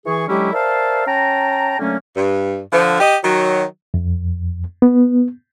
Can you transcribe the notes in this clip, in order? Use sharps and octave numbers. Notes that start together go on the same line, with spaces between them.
E3 G#4 C#6
D3 F#3 G#3 C#4 E4 G4
A#4 C5 D5 E5 F5 A5
C#4 G5 A5 A#5
D3 F#3 A3 A#3 C#4
G2
D3 F3
G4 D#5
D#3 F#3
F2
B3